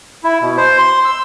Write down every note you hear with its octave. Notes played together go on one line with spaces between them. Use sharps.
E4
B2
C5
C6
E6